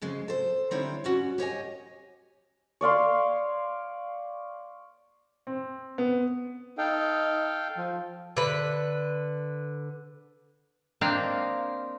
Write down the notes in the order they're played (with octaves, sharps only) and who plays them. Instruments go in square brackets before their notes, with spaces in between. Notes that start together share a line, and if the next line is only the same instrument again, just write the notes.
[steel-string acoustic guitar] F2 C#3 G#3
A4 C5
D3 G3 C4 D#4 E4 C#5
G3 C#4 F#4
G4 C#5 D#5 G#5
[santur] C#5 D5 F5 C6
[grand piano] C4
B3
[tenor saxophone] D#4 [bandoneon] A4 F5 G5
[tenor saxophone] F3
[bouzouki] D3 B4
[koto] A#3 C4 D4 D#4 F5